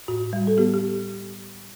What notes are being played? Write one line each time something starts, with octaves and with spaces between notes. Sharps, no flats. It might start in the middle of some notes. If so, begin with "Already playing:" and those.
A2 F#4
G3
A4
B3 G4
G4